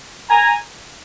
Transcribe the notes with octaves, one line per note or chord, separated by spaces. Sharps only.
G#5 A#5